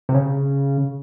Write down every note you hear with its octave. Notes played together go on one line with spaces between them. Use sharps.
C3
C#3